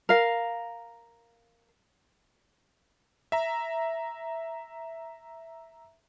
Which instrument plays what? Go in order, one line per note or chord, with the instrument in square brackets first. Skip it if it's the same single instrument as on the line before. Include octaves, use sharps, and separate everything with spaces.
[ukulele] A#4 F5
[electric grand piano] E5 A#5